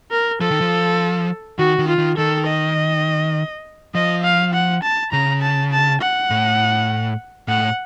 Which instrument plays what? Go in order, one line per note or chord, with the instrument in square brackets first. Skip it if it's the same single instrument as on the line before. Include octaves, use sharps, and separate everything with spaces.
[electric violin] A#4
[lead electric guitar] F3 [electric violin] A4
[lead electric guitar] D#3
F3
[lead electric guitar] D#3 [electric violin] F#4
[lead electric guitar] D#3
[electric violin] F4
[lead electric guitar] D#3
[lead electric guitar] D#3 [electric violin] A4
[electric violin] D#5
[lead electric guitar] F3 [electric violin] D#5
[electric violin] F5
F#5
A5
[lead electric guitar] C#3 [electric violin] A#5
[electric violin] A5
A5
F#5
[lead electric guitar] A2
[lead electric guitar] A2 [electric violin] F#5